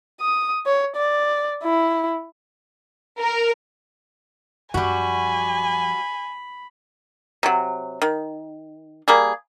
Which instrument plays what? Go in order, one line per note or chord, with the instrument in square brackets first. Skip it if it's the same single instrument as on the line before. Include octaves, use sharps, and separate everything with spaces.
[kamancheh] D#6
C#5
D5
E4
[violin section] A#4
[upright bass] F#2 F3 [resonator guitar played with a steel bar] G3 F#4 [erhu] G#5 [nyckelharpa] B5
[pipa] C3 F#3
D#3
G3 A#3 G#4